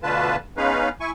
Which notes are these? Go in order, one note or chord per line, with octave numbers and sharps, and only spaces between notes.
D2 B2 D3 F4 B4 A5
G#3 B3 C#4 D#4 B4 F5
E4 G#5 C#6